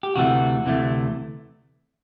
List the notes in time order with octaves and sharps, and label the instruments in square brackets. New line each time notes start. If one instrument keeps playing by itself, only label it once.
[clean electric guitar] G4
D2 C3 E3 A3 F#4
D2 C3 E3 A3